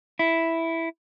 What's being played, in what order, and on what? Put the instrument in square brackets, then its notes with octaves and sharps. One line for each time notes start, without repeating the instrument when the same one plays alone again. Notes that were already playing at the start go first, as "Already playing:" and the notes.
[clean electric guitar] E4